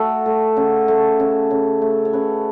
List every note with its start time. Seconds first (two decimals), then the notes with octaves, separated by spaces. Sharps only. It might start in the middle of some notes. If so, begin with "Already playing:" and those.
Already playing: A3 F#4 A4
0.26 A3
0.57 C#3
0.88 A3
1.20 C#3
1.51 C#3
1.82 A3
2.05 C#5
2.13 C#3 B4